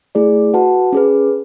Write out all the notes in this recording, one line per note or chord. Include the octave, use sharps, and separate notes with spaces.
A3 E4 G#4 D5
F#4 B4 F#5 A5
C#4 G#4 B4